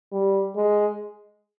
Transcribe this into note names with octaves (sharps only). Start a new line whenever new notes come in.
G3
G#3